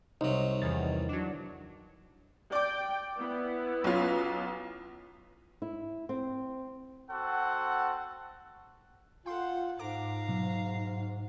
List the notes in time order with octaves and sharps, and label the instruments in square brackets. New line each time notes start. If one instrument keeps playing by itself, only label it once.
[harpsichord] C2 F#3 [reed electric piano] D#4
[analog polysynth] E2 D#3 [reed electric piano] A6
[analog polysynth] F#3 D4
[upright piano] D5 D6 [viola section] G5
[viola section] B3 E4
[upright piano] B1 C#4 F4
[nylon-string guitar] E4
C4
[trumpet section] C4 F#4 A4 F#5
[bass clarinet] F4 [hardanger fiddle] A4 F#5 [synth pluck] G5 C6
[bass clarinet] G#2 [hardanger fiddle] F5 A#5 [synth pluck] D6
[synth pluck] B2 F#3